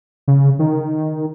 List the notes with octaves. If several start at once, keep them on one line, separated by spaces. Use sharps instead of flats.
C#3
D#3